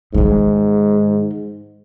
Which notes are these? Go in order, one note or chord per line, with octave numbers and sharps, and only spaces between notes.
G#2 D#3 G#3